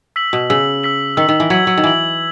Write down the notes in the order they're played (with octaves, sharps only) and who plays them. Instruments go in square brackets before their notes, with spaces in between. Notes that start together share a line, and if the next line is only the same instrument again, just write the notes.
[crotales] E6 B6 F#7
[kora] B2
[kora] C#3 [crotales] E6 B6 F#7
[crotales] E6 B6 F#7
[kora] D#3 [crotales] E6 B6 F#7
[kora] D#3
E3
[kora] F#3 [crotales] G#6 B6 F#7
[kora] F#3
D#3
[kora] E3 [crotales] G#6 B6 F#7